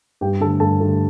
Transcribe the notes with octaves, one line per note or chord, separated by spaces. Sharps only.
G2 G4 G5
D3 A3 A4 A5
G2 A4 A5
D3 A3